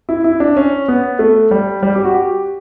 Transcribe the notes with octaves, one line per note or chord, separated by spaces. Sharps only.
E4
E4
D4
C#4
B3
A3
G3
G3
G4
F#4
G4